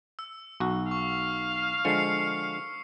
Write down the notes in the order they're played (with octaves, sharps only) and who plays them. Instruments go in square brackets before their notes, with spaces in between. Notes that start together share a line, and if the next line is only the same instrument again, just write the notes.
[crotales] E6
[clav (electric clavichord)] B1 F#4
[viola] F5 [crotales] C#6
[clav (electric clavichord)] D3 F3 G#3 [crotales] C7 C#7